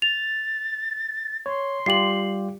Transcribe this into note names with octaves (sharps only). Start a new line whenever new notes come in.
A6 F7
C#5 C6
G3 F4 G4 C7 F#7